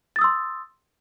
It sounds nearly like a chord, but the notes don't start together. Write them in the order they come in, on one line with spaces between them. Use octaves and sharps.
A6 D#6 E6 C6